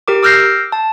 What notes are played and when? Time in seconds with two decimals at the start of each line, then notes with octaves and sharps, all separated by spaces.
0.08 G4 A#4 D6
0.23 D6 E6 F6 G6 A#6 C7
0.72 A5